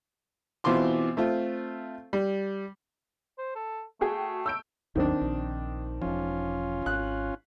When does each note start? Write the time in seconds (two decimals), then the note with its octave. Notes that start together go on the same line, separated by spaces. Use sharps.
0.64 B2 E3 C4 F4 C6 D6
1.17 A3 C4 F4
2.13 G3
3.38 C5
3.55 A4
4.01 A3 F#4 G#4 G5
4.46 E6 G6 D7
4.95 G#1 D#2 D#3 F#3 C4 D4
5.21 A#1
6.02 E1 F3 C#4 F4
6.86 G#1 F#6